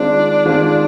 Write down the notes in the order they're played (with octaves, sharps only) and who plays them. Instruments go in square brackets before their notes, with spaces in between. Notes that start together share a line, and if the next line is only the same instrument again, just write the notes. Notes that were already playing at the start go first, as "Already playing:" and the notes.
Already playing: [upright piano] D#3 G#3 C4 F4 [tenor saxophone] D4
[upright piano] D#3 G#3 C4 F4